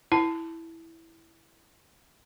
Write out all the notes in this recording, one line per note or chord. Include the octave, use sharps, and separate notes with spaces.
E4 A5